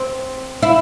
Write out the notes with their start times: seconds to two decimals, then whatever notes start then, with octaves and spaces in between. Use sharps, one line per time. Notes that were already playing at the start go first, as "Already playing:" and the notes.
Already playing: C4
0.63 E4